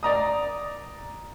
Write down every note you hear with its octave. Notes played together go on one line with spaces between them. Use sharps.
D5 A#5 D#6